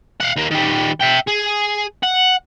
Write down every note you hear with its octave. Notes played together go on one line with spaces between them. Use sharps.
F5 F#5
D#2 A#3
D#3 G3
E5 G5
G#4
F#5